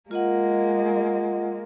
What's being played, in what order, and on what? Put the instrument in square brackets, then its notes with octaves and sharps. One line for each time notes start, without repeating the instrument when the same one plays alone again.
[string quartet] G#3 A#3 [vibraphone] F4 D#5 F#5